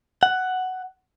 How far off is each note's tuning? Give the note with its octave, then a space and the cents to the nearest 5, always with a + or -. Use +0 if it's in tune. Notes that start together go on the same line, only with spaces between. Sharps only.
F#5 +5